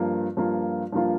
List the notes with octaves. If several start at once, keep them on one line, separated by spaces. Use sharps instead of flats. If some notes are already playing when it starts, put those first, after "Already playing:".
Already playing: G2 F3 A#3
G2 F3 A#3 F4
G2 F3 A#3 F4